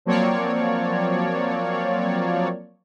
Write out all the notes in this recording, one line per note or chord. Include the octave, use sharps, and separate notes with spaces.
F3 F#3 A#3 C4 C#5 D5